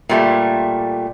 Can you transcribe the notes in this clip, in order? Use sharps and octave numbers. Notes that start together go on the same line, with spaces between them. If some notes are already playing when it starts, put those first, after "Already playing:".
A#2 G3 A3